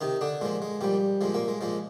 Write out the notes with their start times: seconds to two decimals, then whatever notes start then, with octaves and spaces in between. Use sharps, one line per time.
0.01 C3 D#3 D#4
0.21 D3 D4
0.41 A#2 F3 G#3
0.62 G#3
0.81 A#2 F3 G3
1.21 A#2 F3 G#3
1.34 A#2 A#3
1.48 G#3
1.61 A#2 F3 G#3